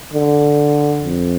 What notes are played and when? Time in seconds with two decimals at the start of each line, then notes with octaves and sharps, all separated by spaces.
0.13 D3
1.03 F2